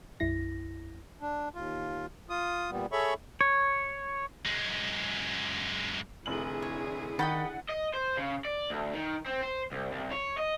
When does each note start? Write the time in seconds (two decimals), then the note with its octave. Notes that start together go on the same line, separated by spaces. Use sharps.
0.20 B1 F#2 E4 A#6
1.21 D4
1.55 D#2 F4
2.29 F4 D#6
2.71 A#2 G3 B3
2.92 G#4 A4 C#5 E5 B5 C#6
3.41 C#5
4.46 F#2 G#3
6.26 F1 D3 E4 G#4 F#7
6.62 C#5
7.19 D#3 D#5 F#5 G5 B5 A6
7.69 D#5
7.94 C5
8.17 C#3
8.45 D5
8.70 D2
8.93 D#3
9.26 C4
9.41 C5
9.72 C2
9.92 C2
10.12 C#5
10.37 D#5